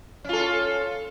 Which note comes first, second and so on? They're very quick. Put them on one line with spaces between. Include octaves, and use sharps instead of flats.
C#4 F4 A4